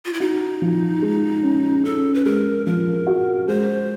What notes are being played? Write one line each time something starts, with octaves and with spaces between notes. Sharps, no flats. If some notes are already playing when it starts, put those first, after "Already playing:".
F4
E4
D#4 F#4
F3
G#3
C#4
C#4 A4
B4
G#3 A#4
F3 A#4
F#4
G#3 C5